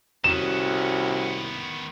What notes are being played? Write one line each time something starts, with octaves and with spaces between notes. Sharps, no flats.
C2 D#3 B3 C#4 F#4 E7